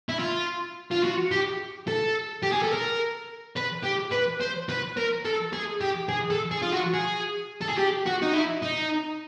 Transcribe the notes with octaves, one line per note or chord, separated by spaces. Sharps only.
E4
F4
F4
F#4
G4
A4
G4
G#4
A4
A#4
B4
G4
B4
C5
B4
A#4
A4
G#4
G4
G#4
A4
G#4
F4
F#4
G#4
A4
G#4
G4
F#4
D#4
E4
D#4